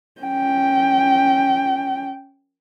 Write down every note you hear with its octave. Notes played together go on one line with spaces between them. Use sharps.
C#4 G5